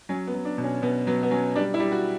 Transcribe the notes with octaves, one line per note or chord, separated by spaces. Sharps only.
F#3 C#4
B3
F#3
D4
B2
C#4
B2 B3
F#3 B3
B3
F#3 C#4
G3 D4
E4
G3
F#4